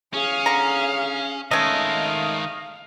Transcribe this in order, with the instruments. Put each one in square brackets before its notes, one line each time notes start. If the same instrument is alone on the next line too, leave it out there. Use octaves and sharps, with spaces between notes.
[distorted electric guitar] C#4 [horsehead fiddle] G#4 F5
[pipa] D3 A#5
[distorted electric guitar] D#3 G#3 [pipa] A3 C#4 [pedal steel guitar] D#5 [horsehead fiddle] F5